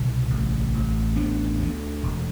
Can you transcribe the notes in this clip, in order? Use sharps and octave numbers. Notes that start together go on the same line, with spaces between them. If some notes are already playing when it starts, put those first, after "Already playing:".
Already playing: C2 B2
A1
A1
D2 B3 D4
D2
E1